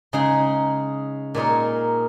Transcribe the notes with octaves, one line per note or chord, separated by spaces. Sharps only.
C#3 G#3 D#4 G#4
A#2 G#3 D#4 A#4 C#5